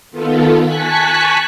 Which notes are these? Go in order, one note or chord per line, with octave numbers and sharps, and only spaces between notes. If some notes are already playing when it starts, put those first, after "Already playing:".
D#3 B3 F4 A4
G#5 A5 C#6 F#6 B6